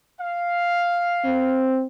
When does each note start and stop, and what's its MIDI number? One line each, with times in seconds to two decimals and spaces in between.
0.19 1.71 77
1.25 1.86 60